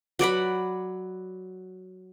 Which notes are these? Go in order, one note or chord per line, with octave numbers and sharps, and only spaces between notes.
F#3 D5 F#5 B5